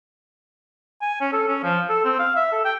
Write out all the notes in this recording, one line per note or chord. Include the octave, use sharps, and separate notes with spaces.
G#5
C#4
A4
C#4
F3
A4
C4
F5
E5
A4
G5